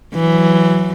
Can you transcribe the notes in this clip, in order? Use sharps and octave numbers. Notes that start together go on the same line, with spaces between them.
E3 F#3